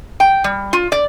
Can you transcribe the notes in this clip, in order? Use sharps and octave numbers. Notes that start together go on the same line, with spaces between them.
G5
G3
F4
D5